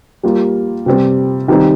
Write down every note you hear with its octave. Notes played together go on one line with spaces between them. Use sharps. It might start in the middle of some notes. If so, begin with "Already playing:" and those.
G3 A#3 F4
C3 G3 C4
D#3 G3 C4 D#4